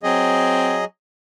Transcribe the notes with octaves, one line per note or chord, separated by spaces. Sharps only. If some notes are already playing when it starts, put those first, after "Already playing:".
F#3 C4 G#4 D#5